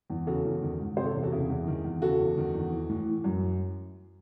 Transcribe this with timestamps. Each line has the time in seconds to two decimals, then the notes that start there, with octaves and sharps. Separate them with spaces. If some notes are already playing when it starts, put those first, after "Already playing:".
0.10 E2
0.27 C#3 F#4 A4
0.44 E2
0.62 D#3
0.80 G#2
0.97 C3 G#4 C5
1.06 A4 C#5
1.14 E2
1.23 F#4 A4
1.32 C#3 E4 G#4
1.49 E2
1.67 D#3
1.84 E2
2.02 C#3 F#4 A4
2.20 E2
2.37 D#3
2.54 E2
2.72 E3
2.90 A2
3.07 E3
3.24 F#2